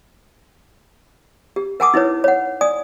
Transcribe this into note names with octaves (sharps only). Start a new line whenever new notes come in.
G4
A#4 F#5 G#5 A5 D6 D#6
D#4 E4 B4 C#5
C#5 F#5
D5 G#5 D#6